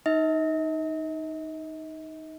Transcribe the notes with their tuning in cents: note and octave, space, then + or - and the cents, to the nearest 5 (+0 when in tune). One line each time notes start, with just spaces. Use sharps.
D#4 +0 D#5 +45